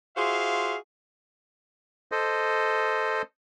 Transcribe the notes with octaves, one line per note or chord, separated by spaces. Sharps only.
F4 F#4 G#4 C5 E5 F5
A4 C5 D#5